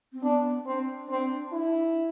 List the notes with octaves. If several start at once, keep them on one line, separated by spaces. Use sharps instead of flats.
C4
B3 D4
C4 D4
C4
E4